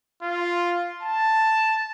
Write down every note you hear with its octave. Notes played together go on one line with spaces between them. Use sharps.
F4
A5